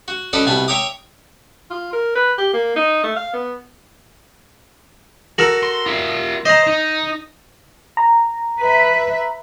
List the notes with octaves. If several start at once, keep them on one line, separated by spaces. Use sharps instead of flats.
F#4
C#4 F#4 A4 B4 D5 D#5
C2 B2 G#5 A5 B5
C#5 E5 G5 A#5 D6 D#6
F4
A#4
B4
G4
A#3
D#4
A3
F5
B3
F#4 A4 A#4
C6
F4 E5
C5 D#5 A#5
D#4
A#5
B4 E5